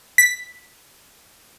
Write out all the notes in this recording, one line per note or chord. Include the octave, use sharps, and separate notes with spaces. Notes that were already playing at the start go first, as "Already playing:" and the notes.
B6